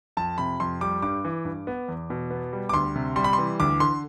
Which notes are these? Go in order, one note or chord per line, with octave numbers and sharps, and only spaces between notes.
F2 A5
C3 B5
F2 C6
G3 D6
G2 D6
E3
G2
B3
E2
B2
B3
G3
D6
D2 C6
C3
G3 C6
B5
C6
E3
D2 D6
D3 C6